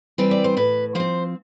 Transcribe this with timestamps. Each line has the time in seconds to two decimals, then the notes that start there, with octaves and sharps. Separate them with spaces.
0.18 E3 G3 C4 B4
0.31 D5
0.44 C5
0.57 A2 B4
0.95 F3 C4 C5